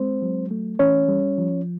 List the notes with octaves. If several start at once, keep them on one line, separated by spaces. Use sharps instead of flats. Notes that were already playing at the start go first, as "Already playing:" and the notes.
Already playing: G#3 C4 C5
F#3
A3
E3 C#4 C#5
G3
F3